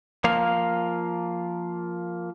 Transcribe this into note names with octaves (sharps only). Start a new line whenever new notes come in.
F3 A#3 F4 F5